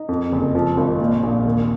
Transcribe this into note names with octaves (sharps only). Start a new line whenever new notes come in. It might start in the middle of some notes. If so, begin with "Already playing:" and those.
Already playing: D#4
F2
F#1
F3
G#1
A#2
A#1
D#2